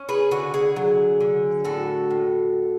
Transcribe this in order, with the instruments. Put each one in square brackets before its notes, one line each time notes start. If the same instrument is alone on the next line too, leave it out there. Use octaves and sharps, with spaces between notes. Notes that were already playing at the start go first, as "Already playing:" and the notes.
Already playing: [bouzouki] C#4
G#4 B4
D3 F#4
G#4
F#3
D3
A2 F#4 A4
A2